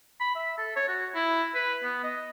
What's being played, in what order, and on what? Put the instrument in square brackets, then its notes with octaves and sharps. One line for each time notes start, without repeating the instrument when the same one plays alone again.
[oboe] B5
E5
A4
C#5
F#4
E4
B4
B3
D#5